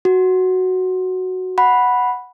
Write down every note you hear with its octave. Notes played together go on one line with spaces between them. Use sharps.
F#4
F#5 B5